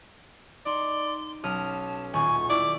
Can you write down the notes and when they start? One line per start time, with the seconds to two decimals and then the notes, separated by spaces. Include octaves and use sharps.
0.66 D#4 D5 C6
1.44 B1 C#4 A5 D#6 F6
2.14 D#1 G#5 C#6
2.50 E4 D5 D6